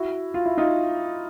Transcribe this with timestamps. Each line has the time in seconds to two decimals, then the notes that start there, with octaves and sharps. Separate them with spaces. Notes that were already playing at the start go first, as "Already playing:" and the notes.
Already playing: E4 F#4
0.34 F4
0.46 E4
0.58 D#4 F4